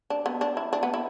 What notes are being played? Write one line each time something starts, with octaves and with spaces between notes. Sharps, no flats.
D4
B3
D4
E4
D4
B3
E4